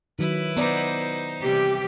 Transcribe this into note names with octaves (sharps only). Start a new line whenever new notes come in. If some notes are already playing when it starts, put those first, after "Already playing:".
D#3 F#3 E4 B4
B3 D#4 C5 D5
C3 E3 G3 G4